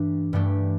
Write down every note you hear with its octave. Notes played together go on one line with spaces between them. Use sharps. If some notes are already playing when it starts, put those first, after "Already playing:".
Already playing: G2 E3 A3 D4 G4
G2 E3 A3 D4 G4